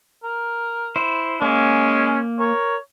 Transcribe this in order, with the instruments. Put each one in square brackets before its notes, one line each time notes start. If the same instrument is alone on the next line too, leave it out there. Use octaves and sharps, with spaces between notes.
[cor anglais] A#4
[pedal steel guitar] E4 C5
[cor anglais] G#3 [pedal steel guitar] A#3 [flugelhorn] C#4
[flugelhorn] A#4 [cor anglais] C#5